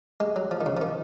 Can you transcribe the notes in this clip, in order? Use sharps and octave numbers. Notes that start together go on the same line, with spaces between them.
G#3
F#3
F3
D#3
C#3
F3
D#3